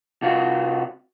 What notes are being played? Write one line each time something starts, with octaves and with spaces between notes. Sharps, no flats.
C3 F4 F#4